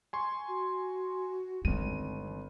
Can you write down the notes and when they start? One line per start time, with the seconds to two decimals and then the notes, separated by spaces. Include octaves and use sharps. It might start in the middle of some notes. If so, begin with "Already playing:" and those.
0.13 G#5 C6 C#6
0.48 F#4
1.65 G1 D#3 G#3 C4 D#7